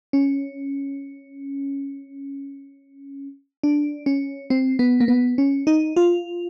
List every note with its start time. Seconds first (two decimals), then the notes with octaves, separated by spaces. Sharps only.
0.13 C#4
3.63 D4
4.06 C#4
4.50 C4
4.79 B3
5.00 A#3
5.08 B3
5.38 C#4
5.67 D#4
5.96 F4